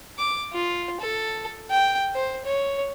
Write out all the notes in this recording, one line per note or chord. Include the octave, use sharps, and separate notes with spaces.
D6
F4
A4
G5
C5
C#5